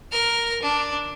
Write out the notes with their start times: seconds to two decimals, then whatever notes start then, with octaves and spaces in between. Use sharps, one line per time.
0.12 A#4 F6
0.62 D4